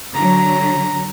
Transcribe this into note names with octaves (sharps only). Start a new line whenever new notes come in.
D3 F#3 A#5